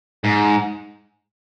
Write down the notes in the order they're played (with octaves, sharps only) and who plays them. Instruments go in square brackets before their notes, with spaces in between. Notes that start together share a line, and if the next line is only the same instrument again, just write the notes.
[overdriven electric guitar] G#2